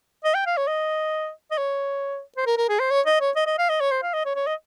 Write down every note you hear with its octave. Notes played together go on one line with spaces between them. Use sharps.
D#5
G5
F5
C#5
D#5
D#5
C#5
C5
A#4
A#4
G#4
C5
C#5
D#5
C#5
D#5
D#5
F5
D#5
C#5
C5
F5
D#5
C#5
C#5
D#5